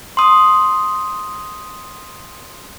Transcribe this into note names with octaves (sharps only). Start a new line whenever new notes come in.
C6 D#6